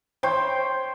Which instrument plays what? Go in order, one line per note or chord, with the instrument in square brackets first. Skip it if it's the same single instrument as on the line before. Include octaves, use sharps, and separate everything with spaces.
[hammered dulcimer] C5 C#5 G5